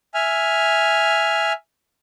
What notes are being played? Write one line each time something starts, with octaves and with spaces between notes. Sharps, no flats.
E5 G#5 F6